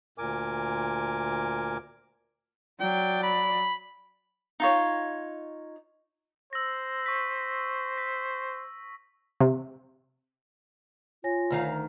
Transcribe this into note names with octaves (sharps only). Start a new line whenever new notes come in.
D2 A#2 A#4 G#5 D6
F#3 D5 G5
B5
D#4 F4 C#5
C5 E6 A#6
C#6 B6
B6
C3
F4 C#5 G#5 A#6
D2 D#3 F5